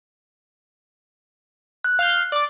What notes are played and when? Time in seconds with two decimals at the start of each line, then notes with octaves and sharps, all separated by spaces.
1.84 F#6
1.99 F5 F6 G6
2.32 D5 D6